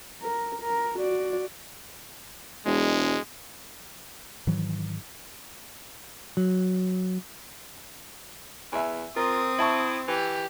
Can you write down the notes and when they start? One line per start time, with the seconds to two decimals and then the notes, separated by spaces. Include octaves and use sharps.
0.21 A#4
0.61 A#4
0.99 F#4 D5
2.66 E1 G#3
4.47 G#2 D#3 E3 F#3
6.37 F#3
8.72 E2 E5 G#5
9.16 C4 F4 A#4 D#6
9.59 E4 E5 A5 C#6
10.08 E3 G4